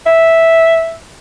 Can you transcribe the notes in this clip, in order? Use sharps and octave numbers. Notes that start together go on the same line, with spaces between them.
E5